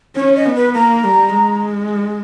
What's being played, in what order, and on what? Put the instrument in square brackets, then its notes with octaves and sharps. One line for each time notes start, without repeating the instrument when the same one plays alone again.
[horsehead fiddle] C#4 [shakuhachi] C#5
[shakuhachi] D#5
[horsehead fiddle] B3
[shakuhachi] B4
[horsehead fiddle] A#3 [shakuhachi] A#5
[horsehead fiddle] G3
G#3